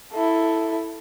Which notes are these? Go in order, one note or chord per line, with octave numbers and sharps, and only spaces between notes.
E4 A4